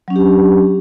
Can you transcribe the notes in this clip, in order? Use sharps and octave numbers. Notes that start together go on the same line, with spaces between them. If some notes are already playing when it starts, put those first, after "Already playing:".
F#3 C#4 D4 G4